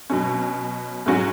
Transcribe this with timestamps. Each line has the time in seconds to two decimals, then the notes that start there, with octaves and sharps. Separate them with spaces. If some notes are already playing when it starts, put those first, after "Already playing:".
0.10 B2 F#3 C#4
1.06 G#2 F#3 C#4 F#4